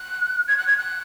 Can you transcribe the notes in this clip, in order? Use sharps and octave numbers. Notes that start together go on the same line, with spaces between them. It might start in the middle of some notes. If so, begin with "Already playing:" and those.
Already playing: F#6
G#6
F#6
G#6
F#6